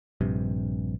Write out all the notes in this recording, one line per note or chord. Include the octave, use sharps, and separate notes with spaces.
A#1 G2 C3